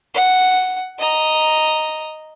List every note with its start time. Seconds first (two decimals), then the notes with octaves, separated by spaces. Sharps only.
0.14 F#5
0.99 D#5 A#5